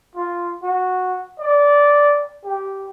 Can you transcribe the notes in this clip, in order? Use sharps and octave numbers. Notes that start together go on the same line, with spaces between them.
F4
F#4
D5
G4